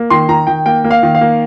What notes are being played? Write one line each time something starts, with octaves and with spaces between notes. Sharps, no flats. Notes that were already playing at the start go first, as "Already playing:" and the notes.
Already playing: A#3
D#3 C6
D#3 A#5
D#3 G5
A#3 G5
A#3
F5
D#3
F5
A#3